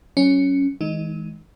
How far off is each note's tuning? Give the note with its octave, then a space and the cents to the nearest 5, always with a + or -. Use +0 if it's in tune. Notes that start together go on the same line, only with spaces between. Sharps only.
F#3 +20 C#4 +0
E3 -40 G#3 +10 D#4 +0